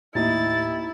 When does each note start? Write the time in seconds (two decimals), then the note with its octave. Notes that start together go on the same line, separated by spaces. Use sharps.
0.15 D#2 A2 D#4 E4 A6